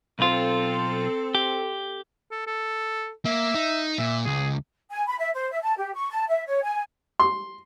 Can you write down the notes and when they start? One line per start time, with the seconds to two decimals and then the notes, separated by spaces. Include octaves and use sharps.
0.19 B1 C4 F4 A4
1.35 G4
2.31 A4
2.47 A4
3.25 A#3 E5
3.54 D#4
3.98 A#2 E5
4.25 C#2 G#4
4.91 G#5
5.06 B5
5.18 E5
5.34 C5
5.51 E5
5.62 A5
5.77 G4
5.94 C#6
6.10 A5
6.28 E5
6.46 C#5
6.62 G#5
7.20 C6